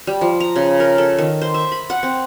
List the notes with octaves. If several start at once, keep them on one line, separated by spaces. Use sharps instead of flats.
G3
F3
A#5
C#3
A#4
A4
D#3
C5
E5
B5
F#5
C4